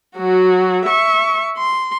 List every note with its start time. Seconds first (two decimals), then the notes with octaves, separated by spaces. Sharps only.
0.17 F#3 F#4
0.86 E5 C#6
1.57 C6